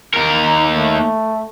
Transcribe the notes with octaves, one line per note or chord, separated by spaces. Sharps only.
D#2 A#4
A3